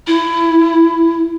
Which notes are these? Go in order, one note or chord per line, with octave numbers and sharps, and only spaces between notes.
E4